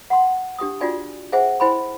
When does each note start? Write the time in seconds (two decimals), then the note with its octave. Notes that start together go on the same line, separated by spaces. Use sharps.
0.10 F#5 C6
0.59 D4 G4 G5 D#6
0.80 D4 F4 F#4 D5 G5 G#5
1.32 G#4 C5 E5 F#5 G#5
1.60 E4 C5 G5 G#5 B5 C6